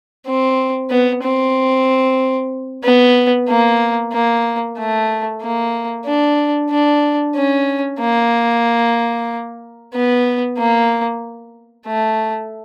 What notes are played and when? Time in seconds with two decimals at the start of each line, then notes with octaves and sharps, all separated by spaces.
0.27 C4
0.90 B3
1.23 C4
2.84 B3
3.48 A#3
4.12 A#3
4.78 A3
5.42 A#3
6.06 D4
6.71 D4
7.35 C#4
8.00 A#3
9.94 B3
10.58 A#3
11.87 A3